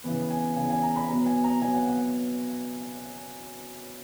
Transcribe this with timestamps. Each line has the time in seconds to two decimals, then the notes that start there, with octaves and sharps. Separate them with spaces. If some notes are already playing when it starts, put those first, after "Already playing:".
0.04 C#3 E3 B3 B4
0.30 G#5
0.56 C#3 E3 B3 G#5
0.70 G#5
0.83 A#5
0.96 B5
1.09 B2 F#3 B3 A#5
1.26 G#5
1.44 A#5
1.61 B2 F#3 B3 G#5
1.74 F#5
1.87 F#5